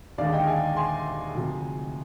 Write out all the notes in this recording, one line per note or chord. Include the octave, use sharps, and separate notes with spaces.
D#2 D3 G#3 D5 F5
D#5 G5
F5 G#5
G#5 C6
D2 C3 F3 G#3